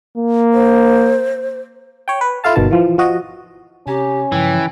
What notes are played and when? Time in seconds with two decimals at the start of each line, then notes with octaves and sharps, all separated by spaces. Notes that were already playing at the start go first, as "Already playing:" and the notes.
0.18 A#3
0.53 C5
2.08 C#5 G5
2.21 B4
2.44 E4 F4 A4 F5 A5
2.56 G1 B2 D#3 A5
2.71 E3 F3
2.98 F3 F#4 D#5
3.87 C3 C#4 G4 G#5 A#5
4.32 G2 C#3 E3 F3 G5